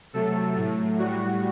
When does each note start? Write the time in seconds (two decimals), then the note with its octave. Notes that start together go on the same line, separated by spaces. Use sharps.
0.13 C3 F#3 A3 A4
0.56 A2 F#3 A3
0.98 A2 G3 F#4